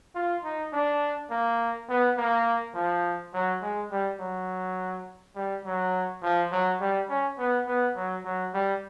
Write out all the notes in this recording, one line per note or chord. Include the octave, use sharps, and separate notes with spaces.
F4
D#4
D4
A#3
B3
A#3
F3
F#3
G#3
G3
F#3
G3
F#3
F3
F#3
G3
C#4
B3
B3
F#3
F#3
G3